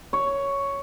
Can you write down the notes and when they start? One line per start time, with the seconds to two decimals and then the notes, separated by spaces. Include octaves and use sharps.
0.13 C#5